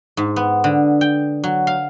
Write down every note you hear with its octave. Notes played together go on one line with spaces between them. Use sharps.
G#2
B3
D3
G5
F#3
F5